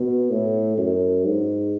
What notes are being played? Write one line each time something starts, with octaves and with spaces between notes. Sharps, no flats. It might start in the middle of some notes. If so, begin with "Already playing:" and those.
Already playing: B2
A2
F#2
G#2